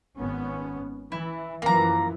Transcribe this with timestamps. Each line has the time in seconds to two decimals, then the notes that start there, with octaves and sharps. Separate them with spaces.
0.16 G#1 B3 C#4
1.12 E3 E4
1.62 F#2 E3 F3 A#3 A#5